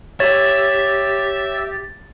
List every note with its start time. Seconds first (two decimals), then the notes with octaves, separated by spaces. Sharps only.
0.20 G4 C#5 E5 A6